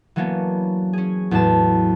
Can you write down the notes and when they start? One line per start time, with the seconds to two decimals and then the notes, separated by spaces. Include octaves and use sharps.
0.16 E3 F#3 A#3 B3 C#4 D4
0.93 C#4 G#4
1.31 E2 A2 F#3 C5 A5